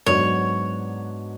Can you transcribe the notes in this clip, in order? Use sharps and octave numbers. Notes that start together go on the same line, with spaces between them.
G#2 F#3 B3 D4 F#4 C#5